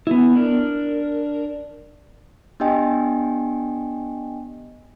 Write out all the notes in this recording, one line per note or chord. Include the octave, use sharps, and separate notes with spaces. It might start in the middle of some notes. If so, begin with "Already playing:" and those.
B3 E4
D4 A#4
B3 D4 G4 D#5 G5 G#5